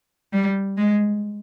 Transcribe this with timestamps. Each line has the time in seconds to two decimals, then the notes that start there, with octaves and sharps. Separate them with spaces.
0.33 G3
0.77 G#3